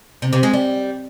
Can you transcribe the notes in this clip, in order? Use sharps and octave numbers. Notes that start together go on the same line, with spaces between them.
C3
C3
G#3
G3